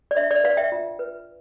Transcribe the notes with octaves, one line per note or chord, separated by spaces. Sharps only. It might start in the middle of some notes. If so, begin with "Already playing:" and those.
D5
D4 E5
D5
B4 D5 F5
E5 G5
F4
B4